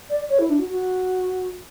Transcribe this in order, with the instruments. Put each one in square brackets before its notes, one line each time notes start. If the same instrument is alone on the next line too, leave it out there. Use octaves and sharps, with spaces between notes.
[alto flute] D5
C#5
E4
D4
F#4
F#4